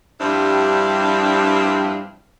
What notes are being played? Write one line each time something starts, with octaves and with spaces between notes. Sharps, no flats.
G2 F3 G3 C4 D4 E4